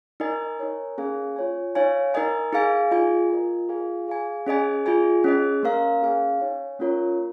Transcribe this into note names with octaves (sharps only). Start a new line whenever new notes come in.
D#4 A#4 D#5 G#5
D#4 A#4 C#5 G#5
A#3 C#4 G#4 F5 G#5
F4 C#5 G#5
D#4 C#5 F5 G#5
D#4 A#4 D#5 G#5
D#4 G#4 F5 G#5
F4 G#4 D#5 G#5
F4 A#4 D#5
F4 G#4 F5 G#5
G#4 F5 G#5
C#4 G#4 D#5 G#5
F4 G#4 D#5 G#5
C#4 G#4 D#5
A#3 C#4 A#4 F5
C#4 G#4 F5 G#5
D#4 C#5 G#5
A#3 C#4 F4 A#4 C#5